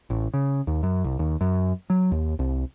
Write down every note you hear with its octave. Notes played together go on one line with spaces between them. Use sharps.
A1
C#3
D#2
F#2
C2
D#2
F#2
F#3
D#2
C2